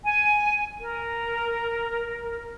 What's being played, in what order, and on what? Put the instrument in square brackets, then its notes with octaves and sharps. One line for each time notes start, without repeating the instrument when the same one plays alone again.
[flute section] G#5
A#4